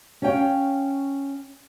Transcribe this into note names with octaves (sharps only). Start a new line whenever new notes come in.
C#4 C#5 F5 G5